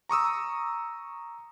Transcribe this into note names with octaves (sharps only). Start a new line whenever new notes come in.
A#5 C#6 D#6 E6